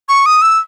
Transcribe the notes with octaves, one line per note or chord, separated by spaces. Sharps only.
C#6
D#6
E6